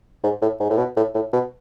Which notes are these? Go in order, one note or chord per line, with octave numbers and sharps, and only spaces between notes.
G#2
A2
G#2
A2
B2
A2
A2
B2